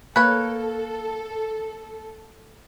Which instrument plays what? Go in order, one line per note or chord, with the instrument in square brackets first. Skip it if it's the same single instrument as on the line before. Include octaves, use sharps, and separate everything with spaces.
[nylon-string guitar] A#3 [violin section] A4 [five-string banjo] B4 C#5